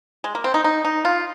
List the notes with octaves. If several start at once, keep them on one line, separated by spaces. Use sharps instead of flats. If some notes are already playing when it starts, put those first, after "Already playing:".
G#3
A#3
C4
D#4
D#4
D#4
F4